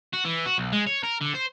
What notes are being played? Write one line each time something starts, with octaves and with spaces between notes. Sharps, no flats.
F#4
E3
F#4
B1
G#3
C#5
A#4
D3
C5